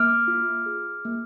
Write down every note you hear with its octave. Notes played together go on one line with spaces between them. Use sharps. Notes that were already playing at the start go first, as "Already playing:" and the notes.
Already playing: A#3 D6 F6
F4
G#4
A#3